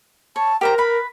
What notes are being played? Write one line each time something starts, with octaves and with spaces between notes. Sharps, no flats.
C#5 A5
G4 A#4 C5 A#5
B4 B5